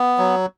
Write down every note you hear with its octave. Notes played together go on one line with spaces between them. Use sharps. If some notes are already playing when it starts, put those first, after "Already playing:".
Already playing: B3
F#3